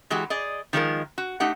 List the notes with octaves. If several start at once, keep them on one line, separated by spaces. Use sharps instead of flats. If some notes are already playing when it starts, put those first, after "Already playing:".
E3 G#3 F#4 G4
G#4 D5 D#5
D#3 F3 G#3 E4 F4 A#4
F#4
A3 D#4 G4 F#5